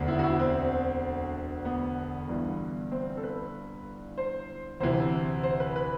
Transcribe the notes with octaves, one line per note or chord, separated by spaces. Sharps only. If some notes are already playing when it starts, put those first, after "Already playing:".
Already playing: E1 D2 D3
E4
F#4
E4
C4
B3
G1 G2 E3
C4
A4
B4
C5
D2 C3 E3 C5
C5
B4
B4